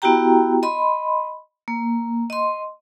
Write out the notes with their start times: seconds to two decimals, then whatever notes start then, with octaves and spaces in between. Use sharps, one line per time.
0.02 B3 E4 F#4 G4 G5 A#5
0.63 D#5 B5 C6
1.68 A#3
2.30 D#5 C6